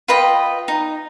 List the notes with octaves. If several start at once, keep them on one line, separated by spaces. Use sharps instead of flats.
F4 B4 D#5 G5
D#4